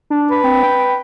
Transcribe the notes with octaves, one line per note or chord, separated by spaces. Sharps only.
D4
B4
C4
G5